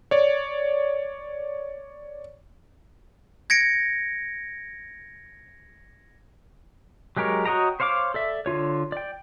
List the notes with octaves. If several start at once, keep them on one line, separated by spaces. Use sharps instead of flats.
C#5 D5
G#6 A#6 C#7 D7
F#3 G#3 G4 A#4 C#5
F#4 C#5 D#5 G5 A#5
C5 C#5 F5 A#5 D6
A4 D5 E5
D3 F4 C#5
D5 G5